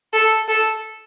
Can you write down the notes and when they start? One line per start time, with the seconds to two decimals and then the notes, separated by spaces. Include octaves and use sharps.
0.13 A4
0.48 A4